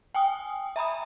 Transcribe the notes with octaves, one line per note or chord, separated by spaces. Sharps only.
G5 G#5 D#6
E5 A#5 B5 D#6